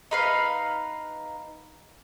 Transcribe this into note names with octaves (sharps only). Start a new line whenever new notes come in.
D#4 B4 F5